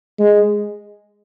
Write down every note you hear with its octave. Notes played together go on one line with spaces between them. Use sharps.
G#3